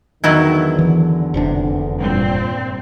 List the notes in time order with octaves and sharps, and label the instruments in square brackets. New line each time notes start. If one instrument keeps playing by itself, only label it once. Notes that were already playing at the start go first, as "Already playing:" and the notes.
[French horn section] E2 D3 [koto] D#3 F#3 E4
[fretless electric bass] E3
F1 C3 D4
[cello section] G2 A#2 C4